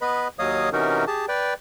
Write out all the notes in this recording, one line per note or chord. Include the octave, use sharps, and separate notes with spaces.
B3 B4 D#5 B5
D#2 F#3 C#5 D#5 F5 D#6
C3 E3 C#4 D#4 F#4 A#4
G4 G#4 A5
B4 D5 G5